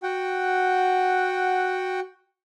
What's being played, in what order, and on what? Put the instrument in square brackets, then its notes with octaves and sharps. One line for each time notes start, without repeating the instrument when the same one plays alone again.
[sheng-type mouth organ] F#4 F#5 G5